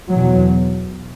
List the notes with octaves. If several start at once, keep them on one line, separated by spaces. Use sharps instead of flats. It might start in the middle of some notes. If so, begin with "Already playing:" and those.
E2 B2 F#3